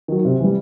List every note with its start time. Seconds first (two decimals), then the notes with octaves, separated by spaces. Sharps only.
0.08 D#3 F#3
0.25 C3
0.40 E3 G3